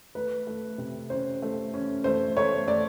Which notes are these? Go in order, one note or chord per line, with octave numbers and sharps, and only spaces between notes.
A3 B4
A3
C3
C#4 C5
A3
C#4
A3 C5
A3 C#5
A3 D5